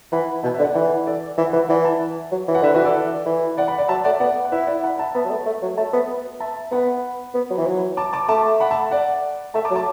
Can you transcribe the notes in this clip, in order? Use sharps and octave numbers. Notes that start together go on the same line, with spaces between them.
E3 F#5 B5
B2 E5 A5
B4 E5
D3
D5 F#5
E3 D5 F#5
A4 D5
E3 E5
F#5
E3 B4 E5
E3 D5 F#5
E5 A5
F#3
E3
F#5
D3 B4 E5
E3 F#4 B4
A4 D5
E3
D5 F#5
F#5 B5
D5 F#5
F#3 E5 A5
A3 D5 F#5
B3 D5 F#5
F#5
E4 B4 E5
D5 F#5
F#5 B5
E5 A5
B3 E5 A5
F#3
A3
A3
F#3
A3 E5 A5
B3
E5 A5
B3 F#5 B5
B3
F#3
E3
F#3
A5 D6
A5 D6
A3 A5 D6
F#5 B5
E5 A5
D5 F#5
A3 E5 A5
A5 D6
F#3
A5 D6